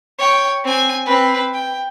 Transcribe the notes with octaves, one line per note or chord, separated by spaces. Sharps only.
C#5 G5
C4 G#5
C4 B4
G5